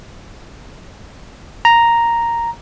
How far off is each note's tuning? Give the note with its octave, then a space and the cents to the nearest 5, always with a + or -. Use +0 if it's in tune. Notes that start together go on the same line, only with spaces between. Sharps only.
A#5 +0